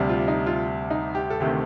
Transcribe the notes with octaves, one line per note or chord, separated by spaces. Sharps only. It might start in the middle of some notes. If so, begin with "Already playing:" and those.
Already playing: D2 C3 G3
F4
D#4
F4
D#4
G4
A4
D2 C3 D#3 A3 G4